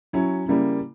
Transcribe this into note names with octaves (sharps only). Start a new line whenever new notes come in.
F#3 C#4 E4
C#3 G3 A#3 E4